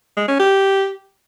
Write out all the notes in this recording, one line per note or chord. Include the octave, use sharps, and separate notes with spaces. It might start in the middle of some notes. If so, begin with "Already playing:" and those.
G#3
C#4
G4